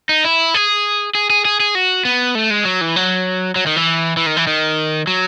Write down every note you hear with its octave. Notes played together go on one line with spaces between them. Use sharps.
D#4
E4
G#4
G#4
G#4
G#4
G#4
F#4
B3
A3
G#3
F#3
E3
F#3
F#3
D#3
E3
E3
D#3
E3
D#3
F#3